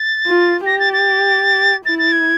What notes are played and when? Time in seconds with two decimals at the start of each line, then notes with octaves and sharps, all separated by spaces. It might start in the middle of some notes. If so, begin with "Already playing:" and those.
Already playing: A6
0.26 F4
0.66 G4 A#6
0.80 A6
0.93 A6
1.85 E4 A6
1.99 A6
2.12 G#6